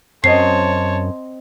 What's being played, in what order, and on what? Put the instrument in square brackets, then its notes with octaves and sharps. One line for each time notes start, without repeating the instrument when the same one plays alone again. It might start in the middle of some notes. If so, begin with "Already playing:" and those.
[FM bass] F#2 [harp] C4 C5 D#5 [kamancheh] C#5 A5 [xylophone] C7